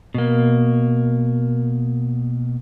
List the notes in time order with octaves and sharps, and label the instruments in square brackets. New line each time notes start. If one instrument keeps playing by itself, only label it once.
[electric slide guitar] B2 A#3